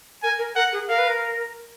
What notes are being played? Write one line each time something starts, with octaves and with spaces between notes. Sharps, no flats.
A#4 G#5
A#4
A#4 F#5
G#4
A#4 F5
B4
A#4